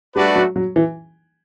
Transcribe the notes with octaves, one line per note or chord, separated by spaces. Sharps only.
G3 A3 D4 F#4 B4 D5
F#3
F#3
E3